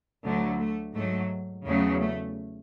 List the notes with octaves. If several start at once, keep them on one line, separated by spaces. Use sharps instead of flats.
D2 D3 F#3 A3
A3
G#2 F#3 A3
E2 C#3 F#3 A3
A3